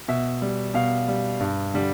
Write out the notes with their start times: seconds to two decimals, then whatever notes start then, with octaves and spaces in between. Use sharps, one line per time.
0.08 B2 E5
0.42 G3
0.74 B2 F5
1.08 G3
1.40 G2
1.74 D3 G3